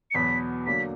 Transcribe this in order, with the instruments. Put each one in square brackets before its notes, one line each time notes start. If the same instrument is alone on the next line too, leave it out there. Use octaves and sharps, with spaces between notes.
[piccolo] C#7
[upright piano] E2 B2 F#3 B3 [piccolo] B6
[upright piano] D3 F#3 A#3 [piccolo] B6